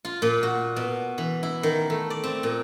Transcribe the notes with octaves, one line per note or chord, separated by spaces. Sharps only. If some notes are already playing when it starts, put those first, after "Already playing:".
F4
A#2
F#4
B2
E3
E4
D#3
A3
D5
C4
A#2